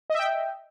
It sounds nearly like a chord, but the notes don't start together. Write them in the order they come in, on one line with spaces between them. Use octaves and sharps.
D#5 E5 G5